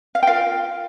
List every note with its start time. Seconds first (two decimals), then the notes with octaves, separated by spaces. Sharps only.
0.15 F5
0.23 G5
0.27 F4 A#4 F5